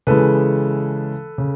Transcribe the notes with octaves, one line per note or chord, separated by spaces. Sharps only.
C#3 E3 G#3 A4 B4
C#3